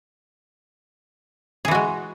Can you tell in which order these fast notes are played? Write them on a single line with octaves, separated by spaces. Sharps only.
G#4 E3 F#4 G#3